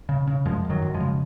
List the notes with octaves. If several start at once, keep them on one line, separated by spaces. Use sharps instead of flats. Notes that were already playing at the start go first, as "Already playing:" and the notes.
C#3
C#3
F#2 F3 G#3
F#2
D#3 F#3
F#2
F3 G#3
C#3